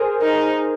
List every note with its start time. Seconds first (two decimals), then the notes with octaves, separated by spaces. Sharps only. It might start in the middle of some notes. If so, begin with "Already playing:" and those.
Already playing: G#4 A#4 C5
0.21 D#4 A#4